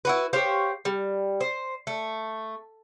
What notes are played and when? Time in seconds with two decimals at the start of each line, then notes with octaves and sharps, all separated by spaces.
0.05 E4 F#4 B4
0.33 G4 C5 C#5 F5
0.85 G3
1.41 C5
1.87 A3